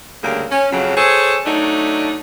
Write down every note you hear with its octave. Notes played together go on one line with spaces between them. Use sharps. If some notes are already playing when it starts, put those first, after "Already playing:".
D2 C#3 G3 A#3
C#4
F2 C#3 F#3
G#4 A4 C5 C#5
F#3 A3 D4 D#4